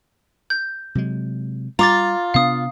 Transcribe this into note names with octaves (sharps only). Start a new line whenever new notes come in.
G6
C3 F#3 G#3
G3 F4 A#5 D6 A6
C3 B3 D4 F5 D#6